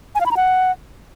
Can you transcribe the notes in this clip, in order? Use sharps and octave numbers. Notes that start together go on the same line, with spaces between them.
G#5
F5
B5
A#5
F#5